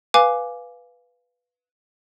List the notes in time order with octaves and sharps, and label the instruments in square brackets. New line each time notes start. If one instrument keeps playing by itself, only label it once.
[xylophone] B4 F5 G#5 D6